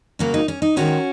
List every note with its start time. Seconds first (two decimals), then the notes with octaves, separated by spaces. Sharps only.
0.19 C#3 F#3 A#3 C#4 F#4
0.34 D#4
0.48 C#4
0.62 D#4
0.76 G#2 D#3 G#3 C#4 F#4